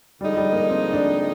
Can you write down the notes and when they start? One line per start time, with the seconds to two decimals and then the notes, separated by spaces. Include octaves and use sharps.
0.21 D3 F3 G3 G#3 D#4
0.37 G3
0.53 A#3
0.69 C4
0.93 D4